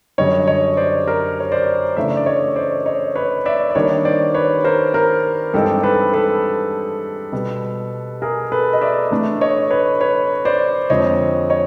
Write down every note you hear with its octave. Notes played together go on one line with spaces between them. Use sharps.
F#2 D3 G3 C#5 D#5
C#5 D#5
C5 D5
A#4 C5
C#5
C5 D5
C#3 E3 A3 D4 D5 E5
D5
C#5 D#5
C5 D5
C#5 D#5
B4 C#5
D5 E5
D5
D#3 G3 A#3 D4 C#5 D#5
C5 D5
B4 C#5
A#4 C5
A#4 C5
G2 E3 G#3 C4 D#4 G4 A4
A4 B4
A4 B4
B2 G3 B3
G#4 A#4
A4 B4
D#5
D5 E5
A2 E3 A3 D4
C#5 D#5
B4 C#5
B4 C#5
C5 D5
F2 D3 F3 G#3 C4 C#5 D#5
C#5 D#5